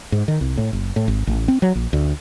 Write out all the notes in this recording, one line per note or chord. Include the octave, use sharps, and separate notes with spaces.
G#2
D#3
C2
A2
F#1
A2
G#1
A1
C4
F#3
A#1
D2